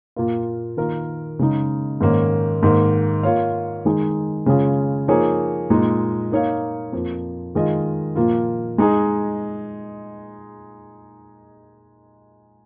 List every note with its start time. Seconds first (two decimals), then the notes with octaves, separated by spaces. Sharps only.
0.16 A#2 A#3 F4
0.77 D#3 A#3 F4 A#4
1.39 C#3 G#3 D#4
2.01 G#2 D#3 A#3 C#4
2.63 G#2 D#3 A#3
3.23 A#3 F4 C#5 F5
3.85 D#3 G#3 D#4 G#4
4.46 C#3 G#3 C#4 F4 G#4
5.08 F3 A#3 D#4 G#4 C#5
5.70 A#2 G#3 D#4
6.32 A#3 D#4 C#5 F5
6.92 F2 F3 A#3
7.55 D#3 G#3 F4 G#4 D#5
8.16 A#2 F3 A#3 F4
8.78 G#3 D#4 G#4